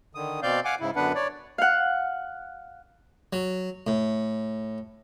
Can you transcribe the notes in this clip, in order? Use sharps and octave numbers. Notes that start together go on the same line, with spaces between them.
D3 D#3 D#6
B2 C4 D5 F5 G6
F5 F#5 G#5 D6
G#2 C#3 E4
F#2 D3 B3 D4 B4 F#5
C#5 D5
F5 F#5
F#3
A2